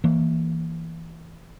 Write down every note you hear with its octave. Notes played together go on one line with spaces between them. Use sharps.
E3 A#3